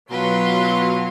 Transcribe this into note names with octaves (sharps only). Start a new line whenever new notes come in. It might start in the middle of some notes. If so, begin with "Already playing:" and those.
B2 F#3 F4 B4 C6